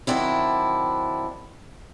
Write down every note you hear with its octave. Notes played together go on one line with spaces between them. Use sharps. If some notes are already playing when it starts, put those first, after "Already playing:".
D#3 F#3 C4 D4 E4